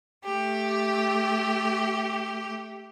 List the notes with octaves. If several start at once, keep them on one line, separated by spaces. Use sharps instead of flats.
A3 G4